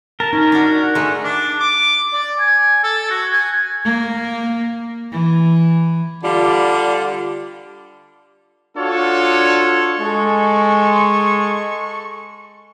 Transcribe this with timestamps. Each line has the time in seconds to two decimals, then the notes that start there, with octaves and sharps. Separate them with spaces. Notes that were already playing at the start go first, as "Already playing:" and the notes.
0.20 A#4 A5
0.33 C#4 D#4
0.52 D4 F#4
0.81 F#5
0.95 G#3 A3
1.24 D4
1.60 D6
2.13 D5
2.39 G#5
2.83 A4
3.10 F#4
3.32 G#5
3.84 A#3
5.12 E3
6.24 D3 G3 F4
8.78 D4 F4 F#4 A4 C#5
9.99 G#3 A4 C#6